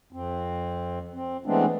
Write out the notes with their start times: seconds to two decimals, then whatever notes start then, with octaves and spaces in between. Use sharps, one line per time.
0.13 F2 C4
1.14 C4
1.46 E3 G#3 A3 B3 C4 D4